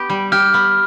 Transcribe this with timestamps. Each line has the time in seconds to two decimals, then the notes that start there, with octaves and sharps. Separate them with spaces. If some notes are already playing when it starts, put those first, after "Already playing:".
Already playing: B3 G4
0.10 G3
0.32 G4 F6
0.54 B3